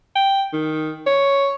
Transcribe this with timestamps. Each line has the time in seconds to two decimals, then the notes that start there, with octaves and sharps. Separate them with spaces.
0.15 G5
0.53 D#3
1.06 C#5